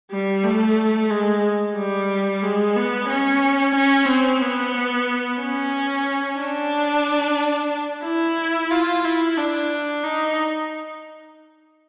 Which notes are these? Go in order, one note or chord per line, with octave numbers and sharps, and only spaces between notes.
G3
A3
G#3
G3
G#3
B3
C#4
C#4
C4
B3
C#4
D4
E4
F4
E4
D4
D#4